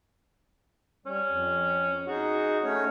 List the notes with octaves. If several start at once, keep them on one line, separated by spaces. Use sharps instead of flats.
G3 C#4
F2
D#4 F#4 G#4
A3 C#4 C#5